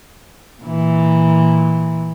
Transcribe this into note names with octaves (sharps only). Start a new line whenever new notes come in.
A#2 E3